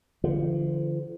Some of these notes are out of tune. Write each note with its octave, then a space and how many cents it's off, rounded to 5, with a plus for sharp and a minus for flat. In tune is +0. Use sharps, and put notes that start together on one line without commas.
D3 +0 F3 -35